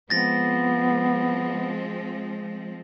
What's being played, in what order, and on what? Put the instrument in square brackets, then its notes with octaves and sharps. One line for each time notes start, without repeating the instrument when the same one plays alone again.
[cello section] F3 G#3 C4 [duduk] B3 [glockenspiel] A6 A#6